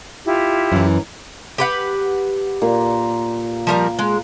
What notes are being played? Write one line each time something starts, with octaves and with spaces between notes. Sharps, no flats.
E4 F4 G4
F#2 E3
G4 B4 F#5
A#2
F3 G3 A#4
G#3